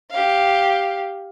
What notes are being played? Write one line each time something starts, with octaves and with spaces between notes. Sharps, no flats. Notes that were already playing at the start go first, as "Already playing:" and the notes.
G4 F5